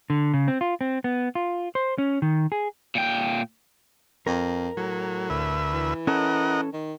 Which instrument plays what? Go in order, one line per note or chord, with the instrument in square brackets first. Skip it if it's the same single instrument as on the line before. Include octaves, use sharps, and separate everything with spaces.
[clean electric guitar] D3
C#3
C4
F4
C4
B3
F4
C5
C#4
D#3
G#4
[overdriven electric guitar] A#2 G5
[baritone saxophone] F2 [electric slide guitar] A#4
[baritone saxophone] A2 [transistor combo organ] F#3
[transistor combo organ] D2 B4 E5
[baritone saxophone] E3
[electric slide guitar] C#4 A4 [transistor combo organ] A#4 D#5 F#5
[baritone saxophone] D#3